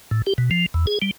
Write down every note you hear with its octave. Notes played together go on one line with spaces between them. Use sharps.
A2
G4
B2
F3
E2
G#4
G3